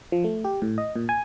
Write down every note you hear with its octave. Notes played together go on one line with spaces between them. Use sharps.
F3
A3
G4
A2
D#5
A#2
G#5